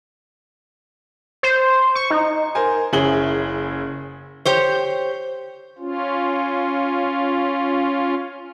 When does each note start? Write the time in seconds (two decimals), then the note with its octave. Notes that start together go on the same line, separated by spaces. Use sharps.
1.43 C5
1.95 C#6
2.10 D#4
2.55 A#4 C5 G#5
2.93 F#1 C#4 E4 G#4 F#7 G7
4.45 G4 C5 C#5
5.78 C#4 F4